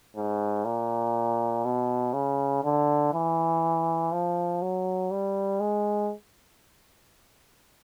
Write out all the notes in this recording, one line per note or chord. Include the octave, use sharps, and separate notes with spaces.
G#2
A#2
B2
C#3
D3
E3
F3
F#3
G3
G#3